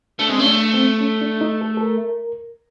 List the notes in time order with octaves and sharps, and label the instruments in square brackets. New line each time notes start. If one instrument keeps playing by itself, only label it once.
[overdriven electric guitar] A3 [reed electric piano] D4
[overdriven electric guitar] G#3 [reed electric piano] C4
[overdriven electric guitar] A3 [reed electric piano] C#4
[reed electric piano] D4
C4
C#4
D4
D#4
A4
A4
A#4